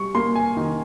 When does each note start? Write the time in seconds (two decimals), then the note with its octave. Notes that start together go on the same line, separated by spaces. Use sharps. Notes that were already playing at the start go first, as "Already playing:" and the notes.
Already playing: G3 C#6
0.15 A#3 C6
0.35 G#5
0.57 D#3